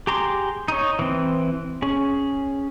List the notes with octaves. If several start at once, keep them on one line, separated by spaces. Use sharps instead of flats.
G4 G#4 A#5 C6 D6
D#4 C#5
E3 C4
C#4 G#4